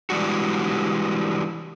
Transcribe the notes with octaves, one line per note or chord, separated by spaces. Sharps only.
E3 G3 G#3 D4 F#4